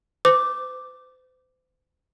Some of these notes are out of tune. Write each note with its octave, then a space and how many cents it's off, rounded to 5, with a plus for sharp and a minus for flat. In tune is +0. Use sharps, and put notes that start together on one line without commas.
C5 -40 D6 +0